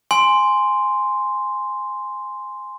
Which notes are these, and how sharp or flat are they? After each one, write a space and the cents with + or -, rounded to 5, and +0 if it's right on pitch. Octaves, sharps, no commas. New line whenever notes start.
G#5 +0 C6 -5